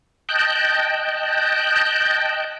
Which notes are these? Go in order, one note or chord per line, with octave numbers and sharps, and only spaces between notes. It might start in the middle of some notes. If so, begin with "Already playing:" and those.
D#5 G5 A5 F#6 G6